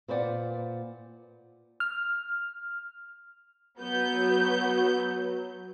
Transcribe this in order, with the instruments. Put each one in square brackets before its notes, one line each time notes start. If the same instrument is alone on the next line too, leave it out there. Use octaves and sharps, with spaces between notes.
[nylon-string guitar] A#2 B4 C5 D5 F#5
[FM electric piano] F6
[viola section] F#3 [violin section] B3 G6